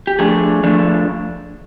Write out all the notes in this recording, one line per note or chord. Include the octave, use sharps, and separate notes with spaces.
G4
F3 A3 D4 G#4
F3 A3 D4